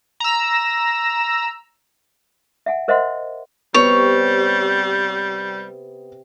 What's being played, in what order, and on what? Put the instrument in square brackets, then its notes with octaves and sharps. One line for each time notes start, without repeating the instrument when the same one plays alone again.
[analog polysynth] A#5 E6
[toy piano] E5 F#5 G#5
A#4 C5 D#5 E5 F#5 C6
[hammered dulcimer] C3 [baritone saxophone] G3 [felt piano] B3 [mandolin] C#5